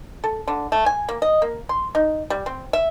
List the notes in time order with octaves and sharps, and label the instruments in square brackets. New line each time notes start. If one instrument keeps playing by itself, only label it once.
[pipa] A4
D3
A3
G#5
A#3
D#5
A#3
C6
D#4
G3
C4
E5